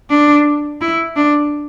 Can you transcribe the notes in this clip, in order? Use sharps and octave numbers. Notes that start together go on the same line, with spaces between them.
D4
E4
D4